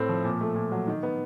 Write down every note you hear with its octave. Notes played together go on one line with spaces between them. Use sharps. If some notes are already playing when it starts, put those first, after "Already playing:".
Already playing: A2 A3 C4
F3
A#2
A3
A#2
F#3
D#3
B3